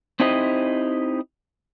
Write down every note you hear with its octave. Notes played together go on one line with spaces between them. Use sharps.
C4 D#4 E4 G4 C5 D#5